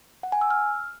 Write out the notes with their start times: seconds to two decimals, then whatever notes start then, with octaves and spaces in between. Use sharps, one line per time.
0.23 F#5
0.32 G#5
0.41 E6
0.51 F6